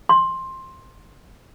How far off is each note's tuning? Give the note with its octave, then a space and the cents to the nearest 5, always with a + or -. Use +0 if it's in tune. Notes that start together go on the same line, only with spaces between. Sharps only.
C6 +15